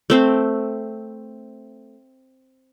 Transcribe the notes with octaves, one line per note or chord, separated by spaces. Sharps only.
A3 C4 C5